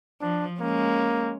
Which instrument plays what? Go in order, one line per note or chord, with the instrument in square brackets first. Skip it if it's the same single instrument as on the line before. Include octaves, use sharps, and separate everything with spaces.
[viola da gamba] F3 [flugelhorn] D4
[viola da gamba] G#3 C#4 [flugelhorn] A#3